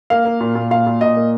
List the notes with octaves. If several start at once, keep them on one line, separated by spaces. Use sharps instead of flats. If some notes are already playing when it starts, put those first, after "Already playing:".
A#3 F5
A#3
A#2
A#2
A#2 F5
A#2
A#2 D#5
A#3